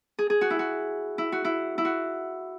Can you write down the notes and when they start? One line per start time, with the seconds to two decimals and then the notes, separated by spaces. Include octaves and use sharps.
0.19 G#4
0.30 G#4
0.41 F#4
0.50 E4
0.59 F#4
1.18 E4
1.32 F#4
1.45 E4
1.78 E4
1.85 F#4